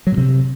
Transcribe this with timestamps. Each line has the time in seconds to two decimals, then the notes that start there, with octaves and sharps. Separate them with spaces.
0.07 F#3
0.12 A#2
0.18 C3